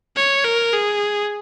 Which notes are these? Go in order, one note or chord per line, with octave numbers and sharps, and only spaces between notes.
C#5
A#4
G#4